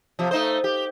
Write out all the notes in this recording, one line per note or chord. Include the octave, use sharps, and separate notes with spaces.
C3 F3
A3 D#4 C5
G4